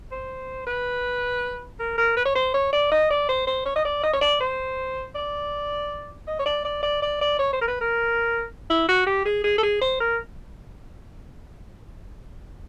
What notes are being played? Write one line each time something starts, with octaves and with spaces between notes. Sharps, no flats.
C5
B4
A#4
A#4
B4
C#5
C5
C#5
D5
D#5
D5
C5
C5
C#5
D#5
D5
D#5
C#5
D5
C5
D5
D#5
C#5
D5
D5
D5
D5
D5
C#5
C5
A#4
B4
A#4
E4
F#4
G4
G#4
G#4
A4
G#4
C5
A#4